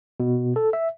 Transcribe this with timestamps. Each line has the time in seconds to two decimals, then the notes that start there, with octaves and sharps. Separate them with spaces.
0.20 B2
0.56 A4
0.73 E5